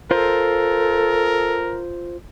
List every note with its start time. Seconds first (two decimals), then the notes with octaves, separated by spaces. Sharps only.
0.11 F4 A4 A#4 C5